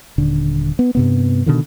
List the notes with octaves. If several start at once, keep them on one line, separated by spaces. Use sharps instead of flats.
D#1 D3
B3
G2 C3 B3
B2 D3 D#3